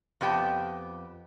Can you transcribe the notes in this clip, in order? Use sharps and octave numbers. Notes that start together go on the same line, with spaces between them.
F2 B3 G4 G5 A5